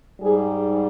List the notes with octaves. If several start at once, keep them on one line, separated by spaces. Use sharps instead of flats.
G#2 G3 G#4